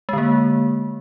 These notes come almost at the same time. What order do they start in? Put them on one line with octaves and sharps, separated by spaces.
G#3 D3 A#3